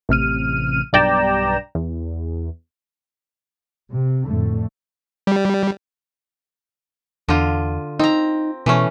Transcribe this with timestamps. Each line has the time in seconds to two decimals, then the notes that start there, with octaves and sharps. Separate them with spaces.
0.09 A1 C3 F6 D#7
0.93 B1 G2 D5 G5 A#5 E7
1.75 E2
3.91 C3
4.25 F2 A2 D3 A3
5.27 G3
7.28 E2 D3 F4
7.99 C4 D#4 A#5
8.66 B2 E3 A3 C#4